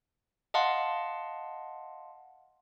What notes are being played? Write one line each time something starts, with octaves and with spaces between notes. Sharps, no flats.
D#5 F5 F#5 A5 C6